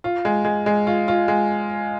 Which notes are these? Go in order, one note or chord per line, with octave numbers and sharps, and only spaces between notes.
F4
G#3
G#3
G#3
F4
F4
G#3